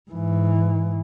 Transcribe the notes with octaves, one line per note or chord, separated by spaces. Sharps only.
G#2 E3